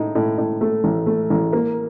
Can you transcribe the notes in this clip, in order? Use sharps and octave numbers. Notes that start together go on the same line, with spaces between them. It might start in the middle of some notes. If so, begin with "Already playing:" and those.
Already playing: A2 D#4
A2
A2
A3
A1
A3
A1
A#3